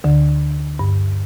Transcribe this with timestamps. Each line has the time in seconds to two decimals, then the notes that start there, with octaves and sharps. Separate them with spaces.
0.04 D2 D3
0.79 G2